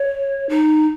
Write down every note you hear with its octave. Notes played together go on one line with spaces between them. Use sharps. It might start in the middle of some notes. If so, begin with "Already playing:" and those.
Already playing: C#5
D#4